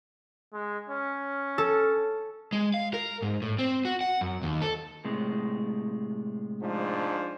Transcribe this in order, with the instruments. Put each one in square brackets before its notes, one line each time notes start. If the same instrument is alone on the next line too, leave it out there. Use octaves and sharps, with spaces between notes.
[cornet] G#3
C#4
[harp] A4
[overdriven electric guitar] G#3
F5
A#4
G#2
A2
C4
F#4
F#5
F#2
D#2
A4
[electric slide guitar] A2 C3 G#3
[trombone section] G#2 F3 D4